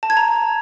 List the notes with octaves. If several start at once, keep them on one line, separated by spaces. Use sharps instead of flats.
A5
G#6
A#5